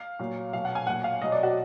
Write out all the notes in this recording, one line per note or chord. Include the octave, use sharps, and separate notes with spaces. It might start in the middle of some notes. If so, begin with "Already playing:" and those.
Already playing: F5
A#2 F#3
B2 F#3 F5
F#5
G#5
A#2 F#3 F#5
F5
B2 F#3 D#5
D5
F#4